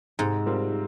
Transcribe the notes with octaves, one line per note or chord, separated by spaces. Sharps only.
G#2 C3
G3 C4 F4 A#4